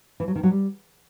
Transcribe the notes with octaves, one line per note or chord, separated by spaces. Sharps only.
E3
F#3
D#3
F#3
G3